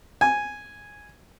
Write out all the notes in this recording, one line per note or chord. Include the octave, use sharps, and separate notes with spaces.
G#5